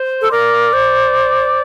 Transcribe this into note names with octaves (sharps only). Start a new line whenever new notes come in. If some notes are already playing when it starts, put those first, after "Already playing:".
Already playing: C5
A4
A#4 D5
C5